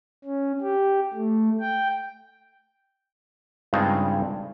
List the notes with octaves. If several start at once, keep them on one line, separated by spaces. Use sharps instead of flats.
C#4
G4
A3
G5
G2 C#3 G#3 C4 D#4 F4